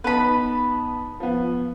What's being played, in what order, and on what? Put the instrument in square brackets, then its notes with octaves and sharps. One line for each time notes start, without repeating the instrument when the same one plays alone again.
[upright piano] B3 D#4 A5 [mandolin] B4 B5
[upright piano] F3 B3